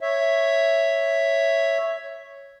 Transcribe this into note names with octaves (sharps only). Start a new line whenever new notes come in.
C#5 E5